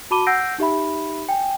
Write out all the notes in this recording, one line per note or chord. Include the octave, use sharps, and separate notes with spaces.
F#4 A5 B5 D6 D#7 G7
F#5 E6 G6 A#6 C7 D7
D#4 G4 E5 B5
G5 G#5